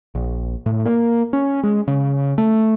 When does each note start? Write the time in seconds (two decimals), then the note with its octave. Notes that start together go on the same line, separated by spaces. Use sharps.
0.15 A#1
0.66 A2
0.86 A#3
1.33 C#4
1.63 G#3
1.88 C#3
2.38 A3